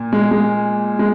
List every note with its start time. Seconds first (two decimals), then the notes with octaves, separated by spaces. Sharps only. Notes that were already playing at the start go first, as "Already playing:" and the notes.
Already playing: A#2
0.13 G#3
0.31 G#3
0.99 G#3